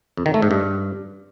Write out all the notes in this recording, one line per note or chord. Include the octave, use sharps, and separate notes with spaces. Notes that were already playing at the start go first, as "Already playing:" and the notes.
F2
D#3
A3
G#2
G2